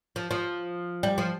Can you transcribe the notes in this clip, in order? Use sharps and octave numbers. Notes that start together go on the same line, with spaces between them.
F3
F3
G3
F3